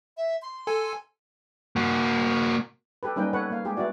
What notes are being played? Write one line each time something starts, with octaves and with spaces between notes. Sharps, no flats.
E5
C6
A4 G#5
A#3 F#4
G4 A4 B4
G3 A#3 C#4 D#4 B4 G5
B3 A4 B4 C#5 F#5
A#3 F5
G#3 G4 G#4
B3 E4 F#4 D5